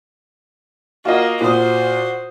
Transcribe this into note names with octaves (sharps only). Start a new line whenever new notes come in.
A#3 F4 F#4 D#5
A#2 F#4 C5 D#6